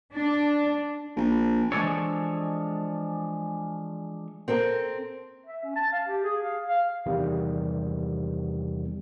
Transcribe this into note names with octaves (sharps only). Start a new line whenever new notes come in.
D4
A#1
E3 F3 G#3 D4 A4 C#5
C4 A4 A#4
E5
C#4
A5
F5
G4
G#4
F5
F5
E2 C3 D#3 G3